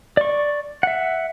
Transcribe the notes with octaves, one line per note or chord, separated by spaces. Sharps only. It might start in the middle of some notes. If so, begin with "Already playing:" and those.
D5 C#6
E5 F#5